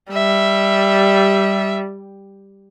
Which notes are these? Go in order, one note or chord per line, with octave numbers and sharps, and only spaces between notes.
G3 E5